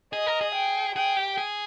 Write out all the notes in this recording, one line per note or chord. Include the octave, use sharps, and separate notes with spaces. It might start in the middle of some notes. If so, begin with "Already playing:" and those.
G#4 D#5
A#4
G#4
G5
G#4 G5
G4
G#4